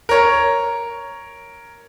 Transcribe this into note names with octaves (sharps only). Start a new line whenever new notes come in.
A#4 C#5